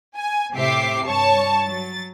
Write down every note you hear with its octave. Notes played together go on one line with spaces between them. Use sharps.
G#5
A2 C3 G4 E5 D6 C7
G2 C#5 A5 C#6
F#3 A6